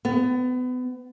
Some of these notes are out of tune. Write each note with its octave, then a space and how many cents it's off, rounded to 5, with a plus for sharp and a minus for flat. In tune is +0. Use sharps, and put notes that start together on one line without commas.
B3 +30